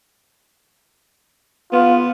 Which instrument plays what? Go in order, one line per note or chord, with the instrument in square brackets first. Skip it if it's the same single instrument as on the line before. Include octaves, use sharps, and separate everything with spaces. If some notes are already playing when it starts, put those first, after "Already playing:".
[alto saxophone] B3 [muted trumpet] F4